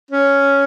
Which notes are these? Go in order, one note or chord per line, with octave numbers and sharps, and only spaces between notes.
C#4